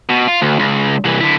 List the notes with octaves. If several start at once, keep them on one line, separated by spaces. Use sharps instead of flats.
B2
F4
D2
C#2
C2 E3
D3 E4